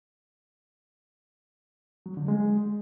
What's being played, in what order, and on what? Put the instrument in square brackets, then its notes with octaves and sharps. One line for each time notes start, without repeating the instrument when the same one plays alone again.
[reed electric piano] F#3
D3
G#3